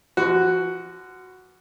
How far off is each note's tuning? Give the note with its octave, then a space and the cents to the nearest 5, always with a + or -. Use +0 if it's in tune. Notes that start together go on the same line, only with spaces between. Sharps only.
F3 -30 F#4 +0 B4 +0